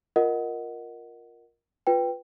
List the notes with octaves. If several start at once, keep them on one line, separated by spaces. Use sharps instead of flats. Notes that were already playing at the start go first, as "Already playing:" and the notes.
F4 A#4 D#5 F#5
F4 B4 G5